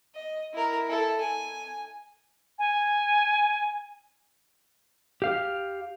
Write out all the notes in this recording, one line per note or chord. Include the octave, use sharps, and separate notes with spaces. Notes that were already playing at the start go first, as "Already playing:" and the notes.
D#5
E4 A#4
E4 A4
G#5
G#5
G4 F5